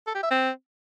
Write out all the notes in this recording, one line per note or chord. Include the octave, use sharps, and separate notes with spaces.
A4
G4
E5
C4